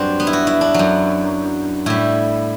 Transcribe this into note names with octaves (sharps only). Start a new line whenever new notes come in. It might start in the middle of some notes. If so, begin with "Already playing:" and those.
Already playing: G2 F#3 C4 D4
B3
E4
F#4
E4
D4
F#2 F#3
A2 G3 E4